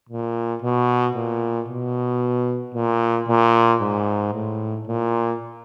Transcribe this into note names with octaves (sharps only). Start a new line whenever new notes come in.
A#2
B2
A#2
B2
A#2
A#2
G#2
A2
A#2